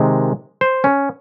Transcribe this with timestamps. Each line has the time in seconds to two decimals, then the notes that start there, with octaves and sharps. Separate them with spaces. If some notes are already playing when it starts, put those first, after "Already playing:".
Already playing: C3 D#3 G#3
0.61 C5
0.84 C#4